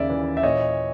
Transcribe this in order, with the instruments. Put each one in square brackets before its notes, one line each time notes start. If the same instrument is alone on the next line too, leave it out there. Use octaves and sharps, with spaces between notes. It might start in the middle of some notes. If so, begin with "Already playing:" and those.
Already playing: [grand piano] D#2 C#3 D5 E5
E3
E5
A#2 C#5 D#5